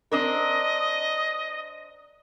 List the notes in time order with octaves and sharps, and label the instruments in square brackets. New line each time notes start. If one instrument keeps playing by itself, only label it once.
[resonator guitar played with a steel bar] C4 D4 A#4 [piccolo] D#5